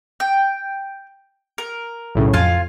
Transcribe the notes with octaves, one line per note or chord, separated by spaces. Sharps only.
G5
A#4
B1 A2 C#3
F2 F4 F5 G#5